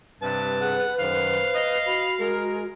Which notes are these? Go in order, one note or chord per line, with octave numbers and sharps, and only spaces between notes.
G2 C3 B4 A5
G#4 F#5
F#2 D#3 C5 F5
D#5
F#4 B5
G#3 A#4